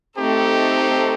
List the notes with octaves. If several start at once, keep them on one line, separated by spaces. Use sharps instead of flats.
A3 C4 D#4 G4 A4